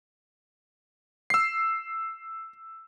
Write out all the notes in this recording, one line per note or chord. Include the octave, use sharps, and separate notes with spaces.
E6 C7